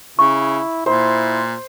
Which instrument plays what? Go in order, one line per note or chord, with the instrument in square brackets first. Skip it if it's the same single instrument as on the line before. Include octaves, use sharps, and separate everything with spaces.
[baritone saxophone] C#3 [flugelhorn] E4 [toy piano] C#6
[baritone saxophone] A#2 [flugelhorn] E4 [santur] C5